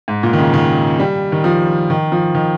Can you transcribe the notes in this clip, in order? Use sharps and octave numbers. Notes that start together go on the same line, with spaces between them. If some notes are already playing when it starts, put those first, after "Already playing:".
G#2
A#2
D#3
C#3
D#3
G3
D#3
F3
D#3
F3
D#3